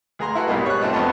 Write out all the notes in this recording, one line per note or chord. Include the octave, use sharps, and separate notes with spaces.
D2 G#4 A#5 C6
E4 F#4 A4 B4
C2 G#2 B2 G3 G#3 A#3
C#5 F#6
A3 C4 D4 D#4 F4
G#1 F2 B3 F4 A5